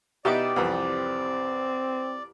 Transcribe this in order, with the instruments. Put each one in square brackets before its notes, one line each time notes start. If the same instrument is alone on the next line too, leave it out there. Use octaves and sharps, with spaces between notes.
[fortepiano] B2 D#4 E4 [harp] G4 B4 D6 [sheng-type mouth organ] D5
[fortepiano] C2 F2 E3 [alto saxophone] C4